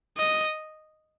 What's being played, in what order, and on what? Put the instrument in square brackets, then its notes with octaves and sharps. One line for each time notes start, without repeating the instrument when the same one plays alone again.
[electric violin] D#5